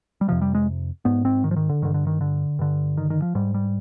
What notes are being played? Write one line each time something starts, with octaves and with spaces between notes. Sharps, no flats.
G3
F2 C3 F3
G3
G#3
G#2 B3
C4
D#3
F3
D#3
D3
G2 D3 D#3
D3
D#3
D3
G2 D3
D#3
D#3
F3
G#2 G3
G3